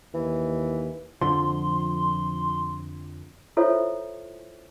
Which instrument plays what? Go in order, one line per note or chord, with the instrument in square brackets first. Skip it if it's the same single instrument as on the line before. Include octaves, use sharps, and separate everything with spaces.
[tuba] D#2 [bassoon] E3
[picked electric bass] F2 D3 F3 [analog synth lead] C6
[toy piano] E4 F4 A4 C5 C#5 E5